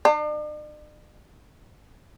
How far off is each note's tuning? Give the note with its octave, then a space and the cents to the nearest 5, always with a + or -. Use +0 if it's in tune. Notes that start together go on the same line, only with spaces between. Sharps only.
D4 +45